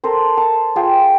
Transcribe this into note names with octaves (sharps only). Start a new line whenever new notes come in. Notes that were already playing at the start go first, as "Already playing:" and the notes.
A4 A#4 C5
A5
F4 G#4 G5